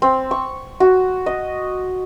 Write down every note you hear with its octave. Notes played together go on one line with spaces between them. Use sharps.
C4
C#6
F#4
D#5